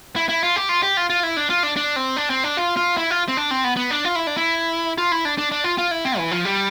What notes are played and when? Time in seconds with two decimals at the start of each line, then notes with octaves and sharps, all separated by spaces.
0.16 E4
0.29 E4
0.43 F4
0.56 G4
0.69 F4
0.83 G4
0.97 F4
1.10 F4
1.23 E4
1.37 D4
1.50 F4
1.63 D4
1.77 D4
1.96 C4
2.17 D4
2.30 C4
2.44 D4
2.57 F4
2.77 F4
2.97 E4
3.11 F4
3.28 C4
3.37 D4
3.51 C4
3.64 B3
3.77 B3
3.91 D4
4.05 F4
4.16 E4
4.27 D4
4.37 E4
4.98 F4
5.12 E4
5.25 D4
5.38 D4
5.51 D4
5.64 F4
5.78 F4
5.91 E4
6.05 C4
6.18 E3
6.31 F3
6.45 G3